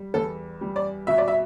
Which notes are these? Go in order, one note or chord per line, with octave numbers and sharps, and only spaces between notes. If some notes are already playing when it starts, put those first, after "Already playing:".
Already playing: G3
E2 A4
G3
D5
B2 E5
D5
E5